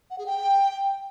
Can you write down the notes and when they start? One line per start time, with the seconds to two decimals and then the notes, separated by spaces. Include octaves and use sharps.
0.10 F#5
0.18 G#4
0.26 G5